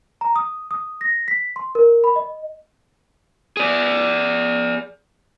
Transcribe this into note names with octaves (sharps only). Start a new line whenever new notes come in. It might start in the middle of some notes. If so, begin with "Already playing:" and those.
A#5
D#6
D#6
A#6
B6
C6
A#4
B5
D#5
G#4 D5